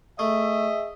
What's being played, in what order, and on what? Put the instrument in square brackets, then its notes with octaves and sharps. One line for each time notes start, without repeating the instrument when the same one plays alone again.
[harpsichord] A3 [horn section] G#4 D#5 E5